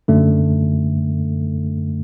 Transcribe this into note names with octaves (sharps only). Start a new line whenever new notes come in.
F#2 D3 A3